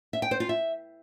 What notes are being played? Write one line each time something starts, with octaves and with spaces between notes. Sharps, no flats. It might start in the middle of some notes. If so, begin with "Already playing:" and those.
E5
G5
C5
F4
E5